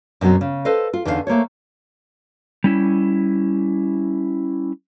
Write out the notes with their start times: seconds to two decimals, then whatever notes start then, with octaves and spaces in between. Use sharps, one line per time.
0.21 F#2 B2 D#3 F#3 C4
0.41 C#3
0.65 A4 B4 C5 D#5 F5
0.93 F4
1.05 E2 D3 C#4 D#4 B4 F5
1.27 A3 A#3 C5 C#5
2.64 G3 C#4 E4